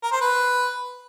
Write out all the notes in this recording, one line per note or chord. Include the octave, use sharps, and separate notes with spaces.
A#4
C5
B4